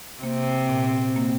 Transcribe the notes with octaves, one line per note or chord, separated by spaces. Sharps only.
C3 A#3 C4
A#2
A#3